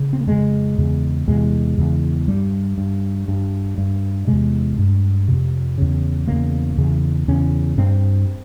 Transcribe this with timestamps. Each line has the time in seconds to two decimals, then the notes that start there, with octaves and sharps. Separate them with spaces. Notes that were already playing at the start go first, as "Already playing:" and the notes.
Already playing: C#3
0.13 C4
0.21 A#3
0.27 F2 C#3 G#3
0.78 E2 C#3
1.28 E2 C3 G#3
1.78 E2 C#3
2.28 G2 G3
2.78 G2
3.28 G2
3.78 G2
4.27 E2 C3 G#3
4.78 G2
5.28 F2 C3
5.78 E2 C#3
6.28 E2 C#3 A#3
6.77 E2 C#3
7.28 E2 C#3 C#4
7.78 G2 C4